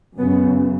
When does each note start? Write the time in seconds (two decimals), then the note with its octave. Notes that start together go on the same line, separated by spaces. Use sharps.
0.18 F#2 C#3 B3